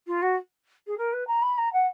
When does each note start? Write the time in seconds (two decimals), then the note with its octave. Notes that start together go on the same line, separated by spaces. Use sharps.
0.07 F4
0.22 F#4
0.87 G#4
0.98 A#4
1.13 B4
1.27 A#5
1.42 B5
1.58 A#5
1.73 F#5